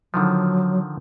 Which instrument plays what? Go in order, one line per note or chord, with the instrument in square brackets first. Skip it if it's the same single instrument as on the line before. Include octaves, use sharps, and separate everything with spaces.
[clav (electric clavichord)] D3 D#3 F3 [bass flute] F#3